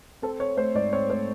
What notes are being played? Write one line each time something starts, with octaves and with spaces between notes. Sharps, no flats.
C4 A4
C4 C#5
A3 C5
G#2 D5
C4 C#5
A3 C5